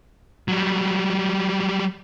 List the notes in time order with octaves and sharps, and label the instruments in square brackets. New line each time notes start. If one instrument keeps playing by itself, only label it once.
[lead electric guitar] F#3 G3